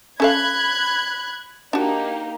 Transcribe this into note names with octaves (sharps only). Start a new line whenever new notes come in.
C#4 A4 F5 B5 F#6 G#6
A#3 D4 D#4 F#4 G4